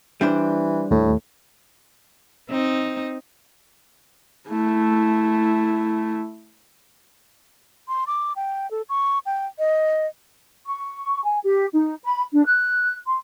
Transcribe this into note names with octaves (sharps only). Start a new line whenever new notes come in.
E3 G3 D4 C5
D#2 A2 A3
C4 D#4
A3 E4
C6
D6
G5
A4
C#6
G5
D#5
C#6
G#5
G4
D#4
B5
D4
F#6
C6